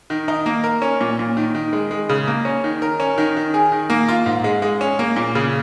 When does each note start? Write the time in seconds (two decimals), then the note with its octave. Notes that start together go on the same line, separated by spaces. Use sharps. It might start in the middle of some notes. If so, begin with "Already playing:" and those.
0.10 D#3
0.28 D#4
0.46 A#3
0.64 A#4
0.82 C#4
1.01 A#2
1.19 A#2
1.37 D#3
1.55 D#3
1.73 G#3
1.91 G#3
2.09 C#3
2.27 A#3
2.45 C#4
2.64 D#3
2.82 A#4
3.00 C#4
3.18 D#3
3.36 D#3
3.54 G#4
3.72 D#3
3.90 A#3
4.08 F4
4.26 G#2
4.44 G#3
4.62 G#3
4.81 C#4
4.99 A#3
5.16 A#2
5.35 C#3